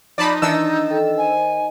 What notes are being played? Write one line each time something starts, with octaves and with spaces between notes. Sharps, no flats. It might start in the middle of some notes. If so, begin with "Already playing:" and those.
F3 D#4 D5 A5 B5
D#3 E3 D4 E6
A4 G5
C5 G#5